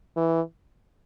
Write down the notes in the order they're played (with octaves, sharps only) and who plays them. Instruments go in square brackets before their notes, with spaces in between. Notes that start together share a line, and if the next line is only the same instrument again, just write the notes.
[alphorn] E3